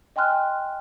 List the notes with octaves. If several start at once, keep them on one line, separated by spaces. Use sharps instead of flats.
D#5 G5 G#5 C6 F6 F#6